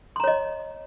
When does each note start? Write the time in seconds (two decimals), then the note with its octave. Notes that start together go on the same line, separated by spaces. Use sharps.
0.16 C6
0.20 A#5
0.24 C#5
0.27 D#5